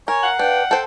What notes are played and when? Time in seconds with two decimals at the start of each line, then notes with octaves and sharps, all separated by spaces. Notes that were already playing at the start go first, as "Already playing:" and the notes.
0.08 A#4 C#5 G#5
0.23 F5 F#5
0.39 D4 B4 G5
0.71 A4 C5 G5 A5